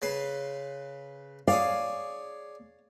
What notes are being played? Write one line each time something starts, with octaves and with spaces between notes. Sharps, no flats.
C#3 B4 C6
G#4 C#5 D5 F5